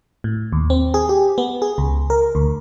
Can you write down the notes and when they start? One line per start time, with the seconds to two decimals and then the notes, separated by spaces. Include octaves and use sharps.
0.24 A2
0.52 D#2
0.70 C4
0.94 G#4
1.09 G4
1.38 B3
1.62 G#4
1.78 C#2
2.10 A#4
2.35 D2